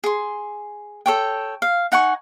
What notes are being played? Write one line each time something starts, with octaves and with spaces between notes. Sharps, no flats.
G#4 C6
A4 C#5 G5
F5
D#4 F#5 G#5 C#6